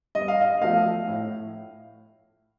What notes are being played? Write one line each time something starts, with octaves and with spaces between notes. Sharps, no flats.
G2 D#5
F5
D#5
F3 A3 F5
A2